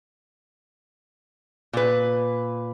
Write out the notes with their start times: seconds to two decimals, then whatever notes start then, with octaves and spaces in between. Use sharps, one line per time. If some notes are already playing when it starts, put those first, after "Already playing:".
1.73 A#2 B4